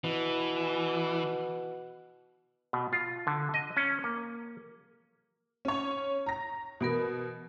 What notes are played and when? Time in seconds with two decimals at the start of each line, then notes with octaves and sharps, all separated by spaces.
0.04 B2 E3
2.73 B2
2.93 F4
3.27 D3
3.54 D#5
3.77 C#4
4.04 A#3
5.65 C#4 C#5
6.26 A#5 A#6
6.81 B2 E3 B3 A#4